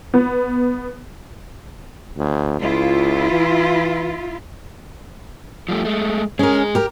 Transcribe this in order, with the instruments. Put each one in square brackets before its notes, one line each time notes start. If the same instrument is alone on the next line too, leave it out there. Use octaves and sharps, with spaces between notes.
[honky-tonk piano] B3
[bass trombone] D2
[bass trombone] C#2 [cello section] E4 F4
[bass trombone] E3
[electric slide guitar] F3 G3 A3
G#3 A3
[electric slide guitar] G#3 G#4 [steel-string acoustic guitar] C#4 A#4
[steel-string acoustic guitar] G4 A#4